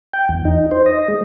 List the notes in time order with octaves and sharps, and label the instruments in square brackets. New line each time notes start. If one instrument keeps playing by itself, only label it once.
[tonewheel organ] G5
E2
D#4
C5
D#5
G#3